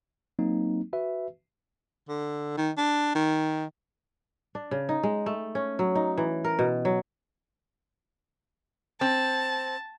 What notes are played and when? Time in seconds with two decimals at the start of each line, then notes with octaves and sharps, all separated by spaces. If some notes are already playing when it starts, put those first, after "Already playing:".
0.39 F#3 A#3 C4 D#4
0.93 F#4 B4 E5
2.09 D3
2.57 D#3
2.77 D4
3.15 D#3
4.55 D4
4.71 C#3
4.89 D#4
5.03 G#3
5.26 A3
5.55 C#4
5.79 F#3
5.95 D#4
6.18 E3
6.44 A#4
6.59 B2
6.85 F#3
9.01 C4 A5